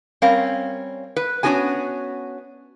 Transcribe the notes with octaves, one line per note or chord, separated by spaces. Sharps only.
G3 C4 C#4 A#4 F5
B4
B3 C#4 D4 F#4 G#4 G#5